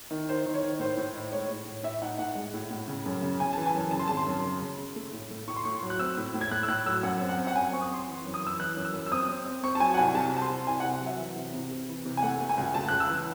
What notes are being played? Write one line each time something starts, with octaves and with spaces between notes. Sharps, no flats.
D#3
D#3 C5
D#3
C#5
D#3
A2 C5
A2
D#4
G#3 C#5
A2
A2
A2 E5
D#4 F#5
A2 F#5
G#3
A2
A2
C#3
F#2
C#3
C#3 G#5
E3 A5
G#5
F#2
C#3 A5
C6
G#1 A5
C6
F#2
C#3
C#3
C#3
A3
A2
A3
A2 C#6
C6
A2 C#6
F#3
F#6
C4 E6
A2
A2
G#6
A3 F#6
E6
A2 F#6
F#3 E6
F#2 F#5
C4
F#5
C4
F#5
F#2 G#5
C4 C#6
D#6
C4 C6
E3
F#2
D#6
E3 E6
E3 F#6
F#2
E6
F#2
E6
C4 D#6
C4
C4
C4 C#6
A5
F#3 G#5
F#5
C2 G#5
C3 A5
C4 A5
C6
C3
C2 G#5
F#5
C3
F#5
F#3 E5
E3
C3
C3
C3
E3
C3
G#5
A3 F#5
A3
G#5
C#2
C#2 A5
F#6
C#2
E6
E3